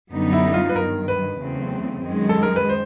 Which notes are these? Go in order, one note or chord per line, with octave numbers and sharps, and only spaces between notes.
F#2 D3 G3 B3 D#4
E4
F4
B4
G2 D#3 F#3 A#4
B4
E2 C#3 F#3 A3 C4
F#2 D#3 G#3
A4
A#4
B4
C5